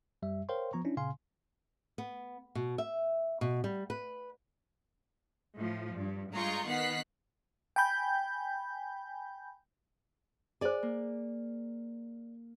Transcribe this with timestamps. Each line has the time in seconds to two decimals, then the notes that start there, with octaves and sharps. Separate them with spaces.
0.22 F#2 G3 E5
0.49 A#4 C5 C#5 F5 G5 C6
0.73 F3 B3 A#5 C#6
0.85 C#4 D4 E4
0.97 A#2 C#3 F5 G#5 C6
1.98 B3
2.55 B2
2.78 E5
3.41 B2
3.64 G3
3.90 B4
5.56 A2 F3
5.95 G2
6.33 G2 G#3 F4 A#5 C#6 G6
6.66 D#3 B3 F#5 F#6 B6 C7
7.76 G5 G#5 B5 G6
10.61 G#4 C5 D5 G#5
10.83 A#3